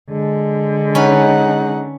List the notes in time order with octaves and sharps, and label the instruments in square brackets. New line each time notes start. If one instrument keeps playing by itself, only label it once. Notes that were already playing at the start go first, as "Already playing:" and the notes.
[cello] D3 [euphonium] G#3
[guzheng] C#4 B4 [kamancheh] D#4 F#5